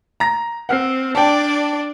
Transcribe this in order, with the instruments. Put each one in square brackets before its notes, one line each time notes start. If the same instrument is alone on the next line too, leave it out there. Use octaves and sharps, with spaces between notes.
[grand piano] A#5 A#6
[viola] C4 [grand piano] F#5 F6 C7
[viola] D4 D5 [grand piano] G5 A5